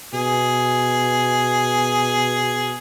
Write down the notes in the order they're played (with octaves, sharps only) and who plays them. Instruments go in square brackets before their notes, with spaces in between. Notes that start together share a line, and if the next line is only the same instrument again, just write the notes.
[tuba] B2 [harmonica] G#4